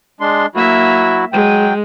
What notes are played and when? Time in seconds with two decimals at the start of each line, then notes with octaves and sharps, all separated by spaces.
0.21 G#3 D4 C6
0.55 F#3 A#3 E4 F#4 E5
1.33 F#3 G#3 G5